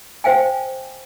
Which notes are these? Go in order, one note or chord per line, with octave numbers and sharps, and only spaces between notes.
C5 F5 G5 G#5